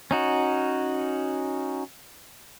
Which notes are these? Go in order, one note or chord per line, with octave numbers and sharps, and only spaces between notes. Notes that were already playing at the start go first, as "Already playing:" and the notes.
C#4 D#4 F#4